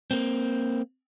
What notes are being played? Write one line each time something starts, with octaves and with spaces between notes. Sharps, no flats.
A#3 C4